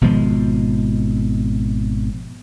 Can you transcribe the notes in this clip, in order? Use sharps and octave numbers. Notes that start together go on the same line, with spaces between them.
G#1 B2 F3 G#3